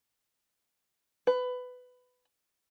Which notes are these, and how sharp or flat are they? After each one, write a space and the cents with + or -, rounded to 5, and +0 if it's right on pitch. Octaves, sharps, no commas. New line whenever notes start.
B4 +15